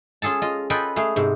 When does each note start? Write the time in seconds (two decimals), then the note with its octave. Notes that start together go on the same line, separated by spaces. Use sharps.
0.22 C#4 F4 G#4 A4 A5
0.42 F4 D#5
0.70 F4 A4 B4 D#5 G5 G#5
0.96 A3 G#4 F5
1.16 G#2 C3